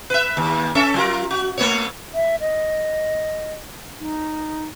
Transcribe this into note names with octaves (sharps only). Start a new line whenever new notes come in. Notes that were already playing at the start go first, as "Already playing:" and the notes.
B4 E5
D#2
C#4 A4 E5
F#3 F4 A#4
F#4
A3 B3 C#5
E5
D#5
D#4